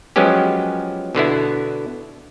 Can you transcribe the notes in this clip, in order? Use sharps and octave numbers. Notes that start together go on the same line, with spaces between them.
F3 F#3 G#3 B3 C#4 G4
B2 D3 B3 E4